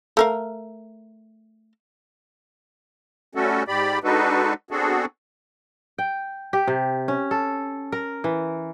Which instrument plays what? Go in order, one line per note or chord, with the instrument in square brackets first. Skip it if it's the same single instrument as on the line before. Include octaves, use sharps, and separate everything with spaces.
[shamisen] A3 A#4 F5
[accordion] G3 A3 C#4 F#4 A4
G#2 G4 D5 B5
G#3 D4 D#4 F#4 A4 B4
B3 C4 D4 F#4 G#4 A4
[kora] G5
G4
C3
C#4
A4
A#4
E3